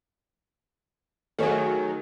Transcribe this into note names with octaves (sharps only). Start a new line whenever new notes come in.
D#3 F#3 A3 G#4 C#5